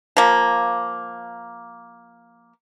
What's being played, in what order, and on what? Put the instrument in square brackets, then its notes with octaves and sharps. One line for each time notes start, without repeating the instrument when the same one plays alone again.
[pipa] F3 A#3